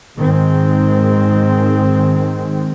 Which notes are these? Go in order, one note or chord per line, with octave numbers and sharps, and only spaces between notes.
G#2 D#3 G#3 C4